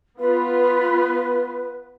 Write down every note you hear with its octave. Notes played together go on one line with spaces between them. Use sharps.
B3 F4 B4